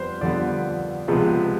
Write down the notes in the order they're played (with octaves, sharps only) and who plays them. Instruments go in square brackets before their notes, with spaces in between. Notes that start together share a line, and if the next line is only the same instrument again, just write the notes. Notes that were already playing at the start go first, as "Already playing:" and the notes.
Already playing: [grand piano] F2 G3 B3 B4 C5
F2 D3 G3 B3 D5
C#2 C3 F3 G#3 B3